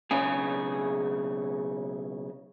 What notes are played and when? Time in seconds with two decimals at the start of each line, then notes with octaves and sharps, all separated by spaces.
0.11 B1 C#3 G#4